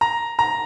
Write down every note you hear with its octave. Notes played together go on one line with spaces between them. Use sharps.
A#5
A#5